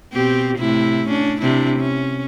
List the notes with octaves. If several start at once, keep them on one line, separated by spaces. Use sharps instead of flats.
B2 C4 G4
A2 C3 E4
C#4 D4
C3 D4 E4
C#4